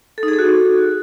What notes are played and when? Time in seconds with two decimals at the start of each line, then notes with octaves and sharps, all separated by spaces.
0.18 A4
0.23 D#4
0.28 G#4
0.33 A4
0.39 F#4